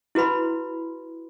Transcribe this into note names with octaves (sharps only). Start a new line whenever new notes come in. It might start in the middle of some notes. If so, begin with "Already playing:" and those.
E4 F#4 B4 B5 C6